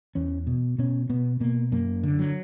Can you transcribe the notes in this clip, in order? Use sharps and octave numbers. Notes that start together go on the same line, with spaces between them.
E2 C#4
B2
B2 C#4
B2 B3
B2 A#3
F#2 A#3
D3
F#3